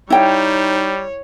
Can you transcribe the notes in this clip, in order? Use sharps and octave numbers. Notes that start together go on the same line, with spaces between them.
G3 D#4 E4 C#5 G5